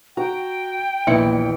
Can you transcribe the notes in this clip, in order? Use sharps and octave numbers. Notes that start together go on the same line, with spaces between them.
F#4 G5 A#5
A#1 D#2 A#2 E3 B3 E4 C#7